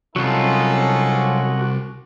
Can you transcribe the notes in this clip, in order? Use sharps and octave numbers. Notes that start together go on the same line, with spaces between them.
C2 F#3 C#4 D#4 F4 F#4 A4